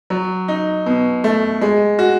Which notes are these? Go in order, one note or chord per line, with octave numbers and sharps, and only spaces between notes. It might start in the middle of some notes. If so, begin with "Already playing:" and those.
F#3
D#4
B2
A3
G#3
F#4